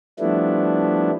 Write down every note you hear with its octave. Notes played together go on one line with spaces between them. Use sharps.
F3 G3 A3 B3 D4 E4